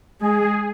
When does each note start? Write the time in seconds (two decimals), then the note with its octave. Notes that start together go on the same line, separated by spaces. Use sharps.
0.20 G#3 G#4